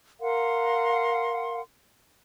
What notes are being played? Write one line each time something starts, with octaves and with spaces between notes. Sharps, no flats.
A#4 F5 F#5 C6